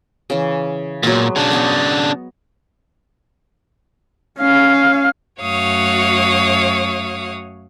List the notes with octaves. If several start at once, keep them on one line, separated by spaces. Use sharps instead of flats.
C#3 E3
A#2 F#3 G#3 B3
C#3 D4
B3 C#5 D#5
C#4 F5
F#2 A3 F#4 C#5 F5 D#6